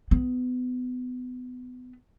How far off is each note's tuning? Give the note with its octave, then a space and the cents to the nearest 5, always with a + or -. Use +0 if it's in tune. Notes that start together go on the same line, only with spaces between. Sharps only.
B3 +25